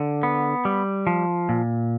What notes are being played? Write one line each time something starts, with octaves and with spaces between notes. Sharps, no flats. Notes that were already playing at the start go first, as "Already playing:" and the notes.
Already playing: D3
B3
G3
F3
A#2